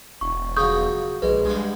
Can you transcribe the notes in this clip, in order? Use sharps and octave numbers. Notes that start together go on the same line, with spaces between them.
E1 C#6
C#3 F3 F#3 C#6 D#6 G6
A#1 G#3 B4
G2 G#3 B3